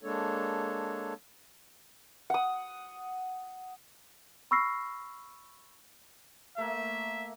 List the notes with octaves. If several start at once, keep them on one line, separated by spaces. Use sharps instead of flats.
G#3 A#3 D4 A4 C#5
F#5 D#6
B5 C#6 E6 F6 A#6 C7
A3 A#3 E5